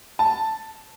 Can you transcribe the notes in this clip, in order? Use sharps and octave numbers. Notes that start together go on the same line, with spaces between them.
A5